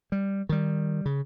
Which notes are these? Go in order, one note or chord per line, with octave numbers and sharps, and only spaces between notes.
G3
D#3 G3
C#3